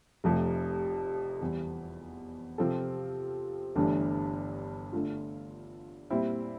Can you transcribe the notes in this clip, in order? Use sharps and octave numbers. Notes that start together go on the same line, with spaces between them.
F1 F2 C3 F3 A3
E2 E3 G3
C3 F3 C4 F4 A4
G1 G2 E3 A3 D4
D3 A3 D4 F4
A#2 G3 C4 E4